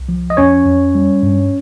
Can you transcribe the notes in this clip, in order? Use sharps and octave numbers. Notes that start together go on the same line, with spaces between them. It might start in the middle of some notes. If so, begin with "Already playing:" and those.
Already playing: C2
F3
D#5
F2 C#4 C#5
F2
G3
G2